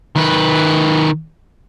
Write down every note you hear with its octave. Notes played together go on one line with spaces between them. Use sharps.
D#3 B4